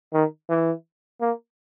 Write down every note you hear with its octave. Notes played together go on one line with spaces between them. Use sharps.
D#3
E3
A#3